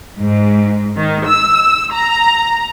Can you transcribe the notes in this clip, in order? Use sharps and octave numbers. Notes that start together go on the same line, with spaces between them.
G#2
D#3
E6
A#5